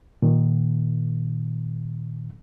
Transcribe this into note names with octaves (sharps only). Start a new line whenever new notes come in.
A#2 D#3